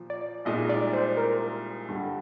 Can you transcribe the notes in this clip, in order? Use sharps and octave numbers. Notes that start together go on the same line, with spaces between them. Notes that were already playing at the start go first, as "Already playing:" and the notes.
Already playing: A#2 F3
D5
C2 A#2 G#3 D#4 D#5
D5
C5
A#4
G2 D3 G3